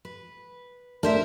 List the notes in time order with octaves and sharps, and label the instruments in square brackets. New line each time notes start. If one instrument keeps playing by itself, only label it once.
[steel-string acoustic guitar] B4
[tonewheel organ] A3 D4 [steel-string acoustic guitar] A#4 C5 E5